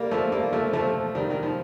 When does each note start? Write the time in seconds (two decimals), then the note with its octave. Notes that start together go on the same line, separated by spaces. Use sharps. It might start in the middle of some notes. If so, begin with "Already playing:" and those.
Already playing: G3 A#3
0.11 F3 A3
0.32 G3 A#3
0.53 F3 A3
0.73 F3 A3
1.15 D#3 G3
1.30 D#3
1.43 F3